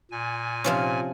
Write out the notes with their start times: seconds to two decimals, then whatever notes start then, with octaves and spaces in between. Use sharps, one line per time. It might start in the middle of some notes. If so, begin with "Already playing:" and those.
0.11 A#2 G#5
0.64 C3 F3 C#4